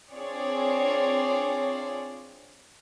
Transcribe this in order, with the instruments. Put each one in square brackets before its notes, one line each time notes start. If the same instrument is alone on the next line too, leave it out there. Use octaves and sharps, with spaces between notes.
[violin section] C4 D4 F4 G#4 C#5 D5